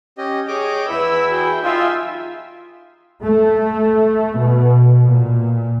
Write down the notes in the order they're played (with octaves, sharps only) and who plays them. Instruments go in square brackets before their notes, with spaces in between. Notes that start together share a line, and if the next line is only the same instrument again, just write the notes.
[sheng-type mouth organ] C#4 G4 D#5
[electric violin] G#4 C#5 [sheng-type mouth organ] D#5 G5 D6
[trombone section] E2 E4 [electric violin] B4 E6 [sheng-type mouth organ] B5
[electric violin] F#4 [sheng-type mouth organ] G#4 G5
[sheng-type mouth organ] D#4 G5 [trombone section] F4 [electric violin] E5 G#5
[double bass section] A3
B2
A#2